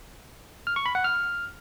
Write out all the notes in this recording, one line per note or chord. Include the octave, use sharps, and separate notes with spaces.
F6
C#6
B5
F#5
F6